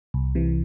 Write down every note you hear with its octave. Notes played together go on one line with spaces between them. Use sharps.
C2
C3 E3